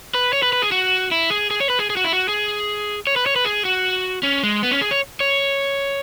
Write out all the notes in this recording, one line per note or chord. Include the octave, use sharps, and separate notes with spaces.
B4
C#5
B4
B4
G#4
F#4
E4
G#4
G#4
C#5
B4
G#4
G#4
F#4
E4
F#4
G#4
C#5
B4
C#5
B4
G#4
F#4
C#4
G#3
B3
C#4
G#4
C#5
C#5